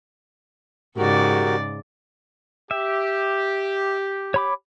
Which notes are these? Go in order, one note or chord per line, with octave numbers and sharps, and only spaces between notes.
G#2 C#3 F#4 G4 A#4 D5
G4 E5
C#5 B5 D6